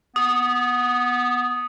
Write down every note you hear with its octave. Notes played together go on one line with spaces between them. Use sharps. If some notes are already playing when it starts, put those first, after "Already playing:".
B3 D#6